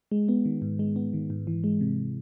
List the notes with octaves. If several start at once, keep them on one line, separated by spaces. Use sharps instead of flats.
G#3
B3
D#3
G#2
G#3
B3
D#3
G#2
E3
G#3
C3